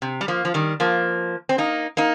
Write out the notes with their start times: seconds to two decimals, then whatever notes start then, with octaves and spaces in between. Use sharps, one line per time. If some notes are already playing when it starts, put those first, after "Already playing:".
0.02 C3
0.21 G3
0.28 F3 A#3
0.45 F3
0.54 D#3 G3
0.80 F3 A#3
1.49 C4
1.58 A#3 D#4
1.97 A#3 D#4